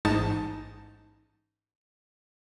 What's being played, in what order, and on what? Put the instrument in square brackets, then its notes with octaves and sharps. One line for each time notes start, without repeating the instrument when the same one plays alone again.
[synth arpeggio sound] A1 G#2 D#4 A5 A6